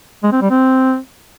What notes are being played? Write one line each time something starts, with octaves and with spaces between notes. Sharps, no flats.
G#3
C4
G3
C4